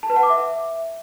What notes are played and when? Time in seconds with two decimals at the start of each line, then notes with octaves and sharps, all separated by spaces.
0.03 A5
0.10 B4
0.16 F#5
0.23 D6
0.30 E5